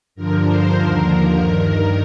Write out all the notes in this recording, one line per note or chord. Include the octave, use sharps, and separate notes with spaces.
G2 D3 F3 A#4
C5
D#2 D3 F3 A#4
G2 D#3